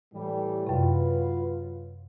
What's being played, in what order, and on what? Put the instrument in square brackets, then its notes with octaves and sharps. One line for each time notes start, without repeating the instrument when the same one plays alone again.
[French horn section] A2 E3 G3
[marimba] F#2 C3 [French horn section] F#3 F4 B4